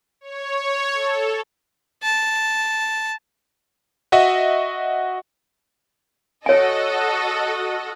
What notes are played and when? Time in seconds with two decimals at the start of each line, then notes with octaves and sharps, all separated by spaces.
0.21 C#5
0.94 A4
2.03 A5
4.12 F#4 D#5 E5 F#5
6.46 F#4 A4 C#5 D#5 G#5